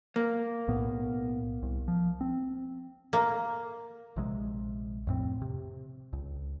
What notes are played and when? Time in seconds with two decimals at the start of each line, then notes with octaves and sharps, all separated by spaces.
0.16 A#3
0.68 B1 A2 B3
1.63 C2
1.88 F3
2.21 C4
3.13 A#3
4.16 A#1 C3 G#3
5.07 F2 A2 C4
5.42 C3
6.13 C#2